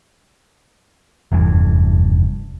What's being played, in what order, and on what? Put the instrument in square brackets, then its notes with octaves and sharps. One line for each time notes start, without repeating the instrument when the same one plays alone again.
[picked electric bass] F1 E2 G2 E3